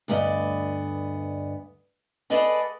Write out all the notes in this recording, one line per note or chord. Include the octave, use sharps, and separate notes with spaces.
D2 G2 B3 D5 D#5
G#4 A4 B4 D5 D#5 F#5